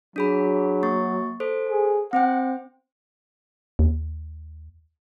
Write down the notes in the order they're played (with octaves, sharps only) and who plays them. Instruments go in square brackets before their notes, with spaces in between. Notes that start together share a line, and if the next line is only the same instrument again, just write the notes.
[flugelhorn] F#3 [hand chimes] D4 G#4 B5
[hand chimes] A#3 C#6 A6
A4 C5
[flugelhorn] G#4
[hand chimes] C4 C5 G5 [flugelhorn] F#5
[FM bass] D#2